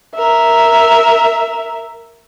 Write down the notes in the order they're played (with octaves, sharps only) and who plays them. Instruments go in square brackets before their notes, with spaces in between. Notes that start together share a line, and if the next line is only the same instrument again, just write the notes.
[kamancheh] A#4 E5